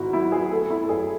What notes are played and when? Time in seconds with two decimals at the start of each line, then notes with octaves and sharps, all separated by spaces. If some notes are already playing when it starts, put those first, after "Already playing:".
Already playing: G#1 G#2 E4 F#4
0.13 F#3 E4
0.28 F#4
0.32 G#4
0.51 A3 A4
0.70 E4
0.83 A4
0.89 F#2 G#4